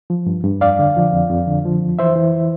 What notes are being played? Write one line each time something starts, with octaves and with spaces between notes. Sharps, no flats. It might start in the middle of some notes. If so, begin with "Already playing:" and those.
F3
G2
G2
F2 D5 F5
D3
F3
F2
F2
D3
F3
F2
E3 C5 E5
E3